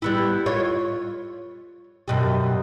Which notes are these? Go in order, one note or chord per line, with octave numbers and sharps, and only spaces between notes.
G3 B3 E4
F4 C#5
F#2 B2 G3